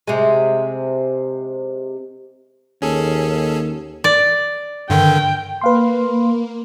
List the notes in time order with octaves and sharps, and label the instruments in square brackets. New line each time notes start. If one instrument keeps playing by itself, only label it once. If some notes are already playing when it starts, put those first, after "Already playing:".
[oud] C3 G#3
[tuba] D#2 [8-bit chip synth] C#4 G#4 A4
[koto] D5
[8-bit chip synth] G2 D3 D#3 [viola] G5
[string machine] A#3 [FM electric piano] B4 F5 C6